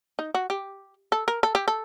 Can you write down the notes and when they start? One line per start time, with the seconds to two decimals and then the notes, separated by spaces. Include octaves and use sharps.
0.19 D#4
0.34 F#4
0.50 G4
1.12 A4
1.28 A#4
1.43 A4
1.55 G4
1.68 A4